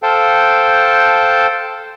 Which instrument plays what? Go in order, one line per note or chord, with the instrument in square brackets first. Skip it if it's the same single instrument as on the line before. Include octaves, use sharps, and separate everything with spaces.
[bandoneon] A4 C5 F5 G5 A5